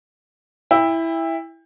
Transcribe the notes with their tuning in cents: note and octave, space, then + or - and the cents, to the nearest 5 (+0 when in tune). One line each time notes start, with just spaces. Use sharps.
E4 +0 G5 +35